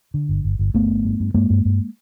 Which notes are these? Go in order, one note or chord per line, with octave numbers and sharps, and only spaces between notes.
D3
G1
G1
G1
G1 A3 B3
G2
G2
G2
G2 G#3 A#3
G2
G2